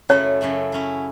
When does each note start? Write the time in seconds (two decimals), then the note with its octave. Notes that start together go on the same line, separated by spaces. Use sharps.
0.09 F#2 C#3 F#3 A3 E4 C#5
0.41 F#2 C#3 F#3 A3 E4
0.72 F#3 C#4 E4